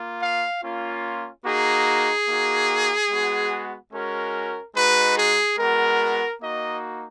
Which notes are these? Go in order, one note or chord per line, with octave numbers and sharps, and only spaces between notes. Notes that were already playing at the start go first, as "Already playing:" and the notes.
Already playing: A#3 F4
F5
A#3 C#4 F4
A#3 D#4 F#4 G#4
A#3 D#4 F#4
G#3 B3 F#4
G#3 C#4 F#4 A#4
G#3 D#4 F#4 B4
G#4
G#3 B3 F#4 A#4
A#3 D#4 F#4 D#5